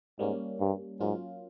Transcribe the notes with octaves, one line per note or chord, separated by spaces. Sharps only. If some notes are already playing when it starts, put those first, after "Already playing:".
G#2 G3 A#3 C#4
G2
G#2 F#3 A#3 C#4 F4